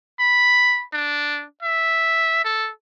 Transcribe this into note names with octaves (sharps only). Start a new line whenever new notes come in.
B5
D4
E5
A4